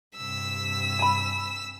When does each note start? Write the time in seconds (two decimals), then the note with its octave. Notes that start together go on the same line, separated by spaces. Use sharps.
0.16 G2 C3 E6 B6
0.99 G#5 B5